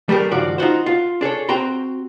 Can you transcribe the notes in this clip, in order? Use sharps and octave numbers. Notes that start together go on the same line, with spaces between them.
G3 A3 G4 G#4 A#4
C#2 G2 D#3 F3 F#4 D5
D#4 F4 F#4 C5
F4
D4 G#4 A4 C#5
C4 F#4 G5 A#5 C6